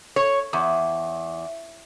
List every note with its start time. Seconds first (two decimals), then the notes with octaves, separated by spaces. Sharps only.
0.16 C#5
0.53 E2